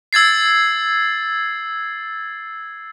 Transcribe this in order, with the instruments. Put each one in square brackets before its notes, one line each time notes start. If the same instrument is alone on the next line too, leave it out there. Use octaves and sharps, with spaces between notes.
[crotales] E6 G#6 A6 C7